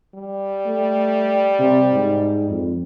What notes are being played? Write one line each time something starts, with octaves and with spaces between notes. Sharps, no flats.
G3
A3
C3
G#2
F2